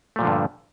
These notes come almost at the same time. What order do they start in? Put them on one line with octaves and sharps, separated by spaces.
A3 A#2 F3 D3 G2